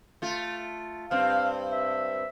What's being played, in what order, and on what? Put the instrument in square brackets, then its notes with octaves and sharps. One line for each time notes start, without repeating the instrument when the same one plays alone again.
[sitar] A3 F4
[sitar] G2 C4 [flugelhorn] F5
[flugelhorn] E5